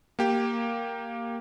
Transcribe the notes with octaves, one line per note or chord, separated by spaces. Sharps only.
A#3 G4